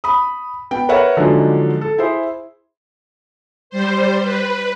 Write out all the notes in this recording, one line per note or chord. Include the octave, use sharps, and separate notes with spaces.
B5 D#6
B3 G5
A#4 B4 C#5 E5 F#5
D3 F3 F#3 G#3 D4 D#4
A4
E4 G#4 C5
G3 C5
B4